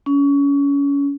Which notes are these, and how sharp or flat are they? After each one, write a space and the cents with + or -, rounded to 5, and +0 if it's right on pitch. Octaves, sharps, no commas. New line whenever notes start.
C#4 +25